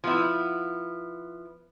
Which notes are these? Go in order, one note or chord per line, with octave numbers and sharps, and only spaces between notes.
F3 B3 E4